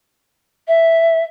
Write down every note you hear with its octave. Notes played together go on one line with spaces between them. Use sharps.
E5